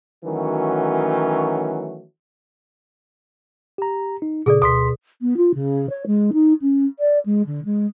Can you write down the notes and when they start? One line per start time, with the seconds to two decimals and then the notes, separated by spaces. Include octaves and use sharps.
0.25 D#3 E3 F#3 A3 C#4 F#4
3.78 G4 A#5
4.22 D#4
4.46 A#2 C#3 G#4 A4 D5
4.62 D2 B2 C6 B6
5.22 B3
5.37 F4
5.54 C#3
5.89 C#5
6.06 G#3
6.33 D#4
6.61 C#4
6.99 D5
7.26 G#3
7.47 D3
7.65 G#3